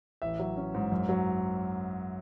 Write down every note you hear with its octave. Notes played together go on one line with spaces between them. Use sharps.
A1 E5
F#3
C#4
G#2
F#2
F#3